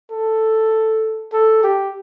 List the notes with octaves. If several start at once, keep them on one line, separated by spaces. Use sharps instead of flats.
A4
A4
G4